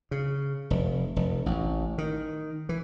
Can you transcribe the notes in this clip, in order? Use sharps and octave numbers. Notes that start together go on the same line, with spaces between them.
C#3
F1
F1
A1
D#3
E3